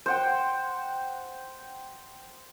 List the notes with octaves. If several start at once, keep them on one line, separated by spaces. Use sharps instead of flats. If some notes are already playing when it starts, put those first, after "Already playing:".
C5 F#5 G5